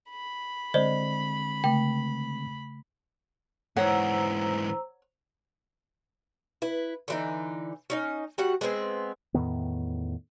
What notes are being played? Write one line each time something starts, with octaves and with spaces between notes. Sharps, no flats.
B5
D3 G#3 C4 C5 D5 D#5
C#3 A3 G5
G#2 E3 C5 C#5 F#5 A#5 E6
E4 B4
D3 E3 D#4
C#4 D#4 D#5
G3 F#4 F#5
G#3 B3 C4 G#4
E2 A2 D#3 B3